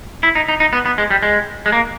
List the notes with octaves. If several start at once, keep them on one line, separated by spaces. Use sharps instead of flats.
E4
D#4
D#4
D#4
B3
B3
G#3
G3
G#3
G#3
A#3